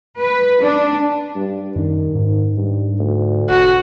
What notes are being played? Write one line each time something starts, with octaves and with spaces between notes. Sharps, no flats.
B4
D4
G2
F#2 D#3
G#2
G2
D2
E1 F#4